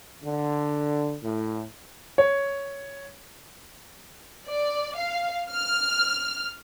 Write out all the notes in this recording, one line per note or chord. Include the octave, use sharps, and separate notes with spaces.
D3
A2
C#5
D5
F5
F6